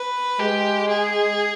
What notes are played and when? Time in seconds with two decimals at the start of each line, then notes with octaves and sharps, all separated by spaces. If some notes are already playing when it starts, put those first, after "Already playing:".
Already playing: B4
0.40 G#3 G4
0.89 G#4